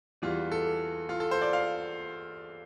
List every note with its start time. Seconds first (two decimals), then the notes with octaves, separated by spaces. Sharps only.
0.22 E2 E3 G3 F4
0.52 A4
1.09 F4
1.20 A4
1.31 C5
1.42 D5
1.53 F5